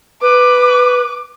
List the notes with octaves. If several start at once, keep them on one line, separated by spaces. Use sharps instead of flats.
B4 D6